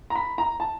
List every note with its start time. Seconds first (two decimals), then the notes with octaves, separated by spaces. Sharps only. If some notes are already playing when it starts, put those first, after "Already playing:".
0.10 A#5
0.15 B5
0.38 A#5
0.60 A5